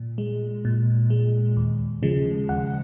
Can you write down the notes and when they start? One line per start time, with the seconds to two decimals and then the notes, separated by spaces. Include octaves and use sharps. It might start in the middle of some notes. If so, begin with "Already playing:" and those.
Already playing: A#2
0.18 G#3
0.65 A#2
1.10 G#3
1.57 D#2
2.03 C#3 F3 G#3
2.49 D#2 F#5